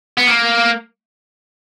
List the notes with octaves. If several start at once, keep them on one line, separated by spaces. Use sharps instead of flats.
B3
A#3